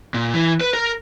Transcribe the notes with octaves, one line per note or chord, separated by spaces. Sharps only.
A#2
E3
B4
A#4 A#5